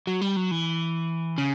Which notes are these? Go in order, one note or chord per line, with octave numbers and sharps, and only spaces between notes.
F#3
G3
F#3
E3
C#3